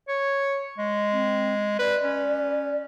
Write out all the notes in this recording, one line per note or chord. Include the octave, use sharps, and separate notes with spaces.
C#5
G#3
C4
B4 D5
C#4